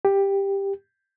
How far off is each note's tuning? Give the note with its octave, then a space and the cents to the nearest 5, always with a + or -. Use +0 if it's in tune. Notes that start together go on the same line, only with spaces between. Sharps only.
G4 +10